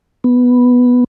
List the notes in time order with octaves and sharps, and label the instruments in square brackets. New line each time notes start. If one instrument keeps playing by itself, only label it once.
[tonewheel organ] B3